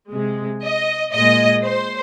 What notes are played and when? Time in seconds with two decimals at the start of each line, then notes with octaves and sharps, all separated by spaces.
0.10 C3 G#3
0.61 D#5
1.12 A#2 G#3 D#5
1.63 C5